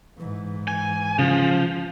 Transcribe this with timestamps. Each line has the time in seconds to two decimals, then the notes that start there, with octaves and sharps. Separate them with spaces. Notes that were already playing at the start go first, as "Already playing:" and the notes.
0.18 G#2 E3
0.68 G#5
1.19 C#3 F3